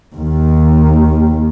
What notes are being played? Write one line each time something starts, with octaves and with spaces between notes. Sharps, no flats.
D#2 D#3